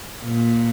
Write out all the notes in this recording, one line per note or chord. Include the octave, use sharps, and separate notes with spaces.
A#2